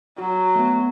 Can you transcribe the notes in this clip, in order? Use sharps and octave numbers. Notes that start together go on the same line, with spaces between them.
F#3 F#4
A3 B3